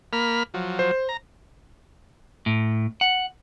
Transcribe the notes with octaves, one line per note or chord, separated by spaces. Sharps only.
A#3 B5 F6
F3 F#3
C5
A#5
A2
F#5